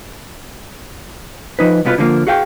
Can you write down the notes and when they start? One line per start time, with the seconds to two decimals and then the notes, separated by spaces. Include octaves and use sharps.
1.59 F3 D#4 B4
1.85 C2 B2 B3 F4 B4 B5
1.98 D3 F3 G#3 A#3
2.27 F#4 G#4 F5 G5